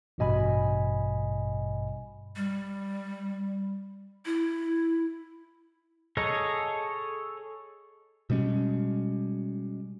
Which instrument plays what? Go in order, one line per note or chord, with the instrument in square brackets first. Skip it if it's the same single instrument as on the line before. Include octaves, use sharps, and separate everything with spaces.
[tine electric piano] A1 G2 B2 D#5 G#5 B5
[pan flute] G3
E4
[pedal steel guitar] G#4 A4 C#5 D#5 A#5
[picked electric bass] B2 G3 G#3 C#4